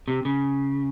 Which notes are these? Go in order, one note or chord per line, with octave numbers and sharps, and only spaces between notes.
C3
C#3